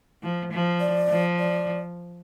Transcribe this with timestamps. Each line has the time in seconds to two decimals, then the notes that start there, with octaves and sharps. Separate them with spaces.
0.23 F3
0.52 F3
0.80 D5
1.09 F3
1.39 D5